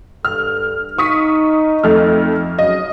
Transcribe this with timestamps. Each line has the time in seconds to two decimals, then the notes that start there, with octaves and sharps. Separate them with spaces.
0.25 G2 A4 F6
0.98 D#4 C#6 D#6 B6
1.84 F2 A3 F6
2.59 C#3 F#3 D#5